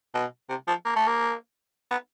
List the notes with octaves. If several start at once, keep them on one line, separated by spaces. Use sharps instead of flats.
B2
C3
F3
A#3
A3
A#3
B3